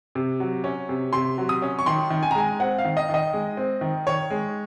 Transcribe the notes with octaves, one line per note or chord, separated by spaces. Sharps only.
C3
F#3
C#4
C3
C3 C6
F#3
D#6
C#4
C#6
D#3 C6
D#3
G#5
A#5
G#3 G#5
C4 F#5
F5
D#3
D#5
D#3 D#5
G#3
C4
D#3
D#3 C#5
G#3